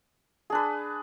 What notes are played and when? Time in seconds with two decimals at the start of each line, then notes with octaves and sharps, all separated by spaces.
0.50 G#4
0.52 D4
0.55 B4